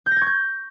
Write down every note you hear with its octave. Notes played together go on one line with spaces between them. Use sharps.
G6
A#6
G#6
C#6
G6